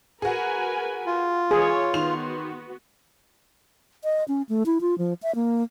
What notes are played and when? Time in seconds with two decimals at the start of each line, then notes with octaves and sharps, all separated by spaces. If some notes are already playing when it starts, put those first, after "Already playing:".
0.22 F#4 G#4 A#4 B4 G#5
1.06 F4
1.51 E3 G#4 C#5
1.94 D#3 B3 F#4 C6 F7
4.04 D#5
4.28 C#4
4.49 A3
4.66 E4
4.81 F4
4.98 F3
5.23 E5
5.35 A#3